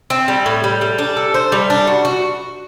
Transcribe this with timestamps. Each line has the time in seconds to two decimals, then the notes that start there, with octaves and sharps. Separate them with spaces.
0.10 C4
0.28 G3
0.46 A2
0.64 G3
0.81 G3
0.98 D4
1.17 A4
1.34 C5
1.52 G3
1.70 D4
1.87 F#4
2.05 F#4